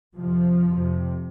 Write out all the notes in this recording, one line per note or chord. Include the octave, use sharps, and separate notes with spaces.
F2 C3 F3
F2 C3